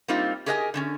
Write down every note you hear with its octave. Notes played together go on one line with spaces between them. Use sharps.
G3 A#3 C4 D#4 F4
G4 G#4 A#4 D#5 F5 G#5
D3 C4 C#4